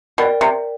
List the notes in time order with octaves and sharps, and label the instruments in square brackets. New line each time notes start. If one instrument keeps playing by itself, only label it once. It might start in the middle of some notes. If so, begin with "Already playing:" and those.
[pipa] B2 [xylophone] A#4 D5 G5
[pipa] C3